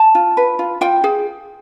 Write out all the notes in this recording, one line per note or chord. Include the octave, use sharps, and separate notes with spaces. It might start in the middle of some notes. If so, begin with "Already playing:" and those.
Already playing: A5
F4
B4
F4
F4 G5
G#4